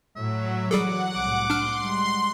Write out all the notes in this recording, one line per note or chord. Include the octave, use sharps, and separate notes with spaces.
A2 F#3 E5
E3 G3 G#4 A4 F#5 D6
C2 A2 D6
D4 C6 F6
G3 G#3